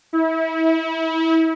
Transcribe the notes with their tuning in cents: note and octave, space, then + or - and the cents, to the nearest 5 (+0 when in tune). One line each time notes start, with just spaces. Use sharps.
E4 -30